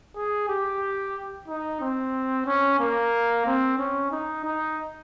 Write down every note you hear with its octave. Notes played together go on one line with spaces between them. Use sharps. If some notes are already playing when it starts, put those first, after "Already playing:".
G#4
G4
D#4
C4
C#4
A#3
C4
C#4
D#4
D#4